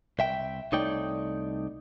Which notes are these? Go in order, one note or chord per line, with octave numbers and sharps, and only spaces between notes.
C2 E5 G5
C2 A3 D#4 C#5 D5 G5